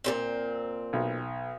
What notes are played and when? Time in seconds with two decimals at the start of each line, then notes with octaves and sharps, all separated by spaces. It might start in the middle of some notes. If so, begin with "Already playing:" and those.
0.04 A#2 C#3 C4
0.93 B1